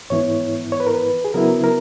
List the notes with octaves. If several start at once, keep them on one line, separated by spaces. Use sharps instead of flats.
G#2 E3 B3 E4 C#5
C#5
B4
A#4
B4
G#4
C#3 F#3 B3 E4 A#4
A#4